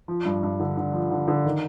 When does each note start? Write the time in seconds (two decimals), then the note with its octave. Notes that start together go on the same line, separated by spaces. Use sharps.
0.08 F3
0.25 G2
0.43 G2
0.60 D3
0.77 D3
0.93 F3
1.11 D3
1.28 D3
1.45 D#3